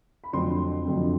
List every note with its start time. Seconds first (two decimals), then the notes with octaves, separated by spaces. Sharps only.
0.24 B5
0.33 F2 D3 F#3 A3 C4 C6
0.85 F2 D3 F#3 A3 C4